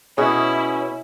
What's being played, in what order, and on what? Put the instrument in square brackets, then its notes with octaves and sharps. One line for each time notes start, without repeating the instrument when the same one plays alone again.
[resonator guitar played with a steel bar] B2 G#4 [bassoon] C#4 [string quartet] E4